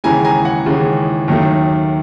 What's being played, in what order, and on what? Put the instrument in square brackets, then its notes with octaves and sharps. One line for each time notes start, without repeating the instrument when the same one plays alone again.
[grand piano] D#2 C#3 E3 G#3 G#5 A#5
G#5 A#5
F#5 G#5
D#2 C#3 E3 G#3
D#2 D#3 F#3 A3